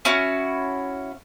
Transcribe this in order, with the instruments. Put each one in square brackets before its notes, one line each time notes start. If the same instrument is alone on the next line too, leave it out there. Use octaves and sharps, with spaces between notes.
[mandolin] C#4 E4 F#4